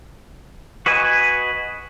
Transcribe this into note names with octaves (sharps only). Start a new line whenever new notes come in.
F#4 B4 D#5 G#5